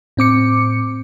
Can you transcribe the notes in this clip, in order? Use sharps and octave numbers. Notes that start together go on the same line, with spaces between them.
A2 C4 D6 C#7